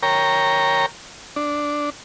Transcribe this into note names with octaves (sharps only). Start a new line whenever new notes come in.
A#4 C#5 G5 A#5
D4